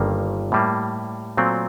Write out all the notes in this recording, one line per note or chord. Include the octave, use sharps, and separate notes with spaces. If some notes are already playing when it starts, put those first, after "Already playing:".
Already playing: G1 G2 D#3 G3 A#3
A2 G3 A#3
A#2 F#3 A3 C4